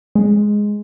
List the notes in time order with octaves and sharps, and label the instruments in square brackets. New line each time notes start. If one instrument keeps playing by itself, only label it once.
[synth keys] G#3